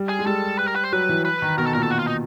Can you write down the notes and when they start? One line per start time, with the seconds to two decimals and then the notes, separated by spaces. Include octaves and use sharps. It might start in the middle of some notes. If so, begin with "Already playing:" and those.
Already playing: G3
0.09 G#4
0.19 G#3
0.26 G3 A4
0.59 B4
0.67 A#4
0.76 B4
0.84 C5
0.93 F#3 B4
1.09 E3
1.25 B4
1.42 D#3
1.57 B2 A#4
1.66 A4
1.74 A#2 A#4
1.83 A4
1.90 F#4
1.99 F4
2.07 D#4